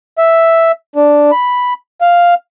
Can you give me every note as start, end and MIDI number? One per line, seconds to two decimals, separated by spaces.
0.18 0.72 76
0.96 1.31 62
1.32 1.73 83
2.01 2.34 77